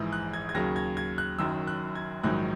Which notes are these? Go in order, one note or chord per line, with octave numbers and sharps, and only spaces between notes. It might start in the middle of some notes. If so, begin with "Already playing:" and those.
Already playing: A#1 G#2 E3
F#6
G#6
G#6
D#2 C#3 F#3 A#6
G#6
G#6
F#6
F#1 F#2 D#3 F#3 E6
F#6
G#6
A#1 G#2 D#3 F#3 F#6